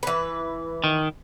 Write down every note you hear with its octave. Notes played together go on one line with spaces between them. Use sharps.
E3 B4
D#3